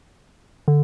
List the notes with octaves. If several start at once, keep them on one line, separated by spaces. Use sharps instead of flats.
D3